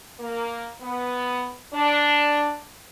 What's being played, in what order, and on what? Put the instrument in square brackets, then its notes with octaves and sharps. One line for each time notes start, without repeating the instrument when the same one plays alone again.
[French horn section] A#3
B3
D4